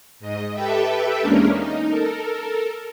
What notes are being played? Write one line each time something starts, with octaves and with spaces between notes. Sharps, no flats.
G#2 D#5
G4 A4 B4 E5 G5
E2 G#3 A#3 C#4 D4 A#4
D#4
A4 A#4